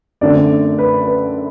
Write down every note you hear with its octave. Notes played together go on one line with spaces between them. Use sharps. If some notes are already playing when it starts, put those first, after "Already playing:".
F#2 D3 A3 C4 D5
B4
B4